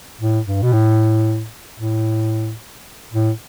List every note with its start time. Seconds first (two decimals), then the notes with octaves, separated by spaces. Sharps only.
0.21 A2
0.47 G2
0.62 B2
0.73 A2
1.80 A2
3.12 A2